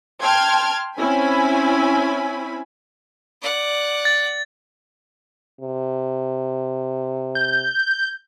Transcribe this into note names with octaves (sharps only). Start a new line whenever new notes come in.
G5 A5 C6 F6 G#6
C4 C#4 E4 G#5 B5
D5 F#5
A6
C3
G6